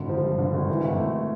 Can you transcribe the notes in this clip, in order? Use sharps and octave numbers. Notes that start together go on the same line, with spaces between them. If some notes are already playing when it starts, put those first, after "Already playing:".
Already playing: G#1 D3
F3
G2
D3
G#1
E3
G#1
A3